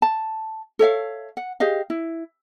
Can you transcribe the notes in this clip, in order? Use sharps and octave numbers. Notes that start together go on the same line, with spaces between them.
A5
A4 C#5 E5 F5
F#5
G4 G#4 D#5 F5
E4